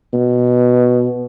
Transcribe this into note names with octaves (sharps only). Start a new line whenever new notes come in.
B2